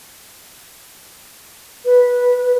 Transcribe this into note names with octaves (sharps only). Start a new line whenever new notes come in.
B4